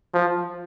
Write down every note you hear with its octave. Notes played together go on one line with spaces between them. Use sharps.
F3